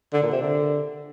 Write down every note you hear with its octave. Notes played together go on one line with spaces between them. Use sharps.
D3
A#2
C3
D3